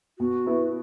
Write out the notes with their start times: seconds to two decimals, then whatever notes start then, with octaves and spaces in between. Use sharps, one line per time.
0.19 B2 F#4
0.46 B3 E4